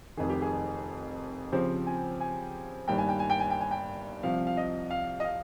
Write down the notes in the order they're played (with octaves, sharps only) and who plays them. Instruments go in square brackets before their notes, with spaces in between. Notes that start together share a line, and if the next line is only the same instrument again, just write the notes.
[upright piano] F1 F2 D#3 [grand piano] G#4
[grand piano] G4
G#4
[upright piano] C#3 F3 C4 G4 [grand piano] C5
[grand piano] G#5
G#5
[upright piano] G1 G2 D#3 A#3 [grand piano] G5
[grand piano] G#5
G5
G#5
G5
G#5
G5
G#5
G5
[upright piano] C2 C3 F3 [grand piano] F5
[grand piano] F5
D#5
F5
D#5
F5